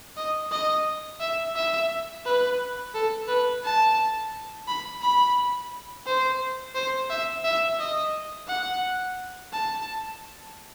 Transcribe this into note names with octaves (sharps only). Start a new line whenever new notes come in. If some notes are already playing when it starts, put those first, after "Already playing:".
D#5
D#5
E5
E5
B4
A4
B4
A5
B5
B5
C5
C5
E5
E5
D#5
F#5
A5